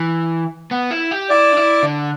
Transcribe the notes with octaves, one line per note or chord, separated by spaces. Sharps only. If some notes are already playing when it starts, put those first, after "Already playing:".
Already playing: E3
B3
E4
G4
E4 D5
D4
E4
D3